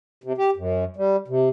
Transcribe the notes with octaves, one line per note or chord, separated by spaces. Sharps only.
C3
G4
F#2
G3
C3